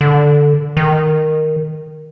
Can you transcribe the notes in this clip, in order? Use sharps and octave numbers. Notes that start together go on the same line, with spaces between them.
D3
D#3